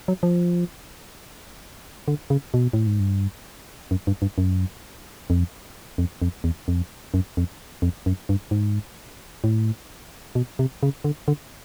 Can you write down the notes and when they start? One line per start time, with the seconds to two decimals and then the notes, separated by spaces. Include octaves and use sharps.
0.08 F#3
0.23 F3
2.08 D3
2.30 C#3
2.54 B2
2.73 A2
2.87 G#2
3.00 G2
3.91 F#2
4.07 G2
4.22 G2
4.38 F#2
5.30 F2
5.98 F2
6.22 F2
6.44 E2
6.68 F2
7.14 F#2
7.37 F2
7.82 F2
8.06 F#2
8.29 G2
8.51 G#2
9.44 A2
10.35 B2
10.59 C3
10.83 C#3
11.04 D3
11.28 D3